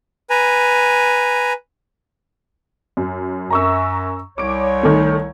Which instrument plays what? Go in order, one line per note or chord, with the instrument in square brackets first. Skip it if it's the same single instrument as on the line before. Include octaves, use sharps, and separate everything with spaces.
[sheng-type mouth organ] B4 G#5 A#5
[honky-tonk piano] F#2
[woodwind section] F#2 [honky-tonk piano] A#5 C#6 E6
[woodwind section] C2 C#5 [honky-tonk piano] D6 D7
[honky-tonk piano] D#3 A3